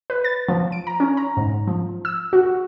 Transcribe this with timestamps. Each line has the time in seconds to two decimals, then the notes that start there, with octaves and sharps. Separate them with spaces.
0.10 B4
0.25 A6
0.48 F3
0.72 D7
0.87 A#5
1.00 C#4
1.17 A#5
1.37 G#2
1.67 F3
2.05 E6
2.33 F#4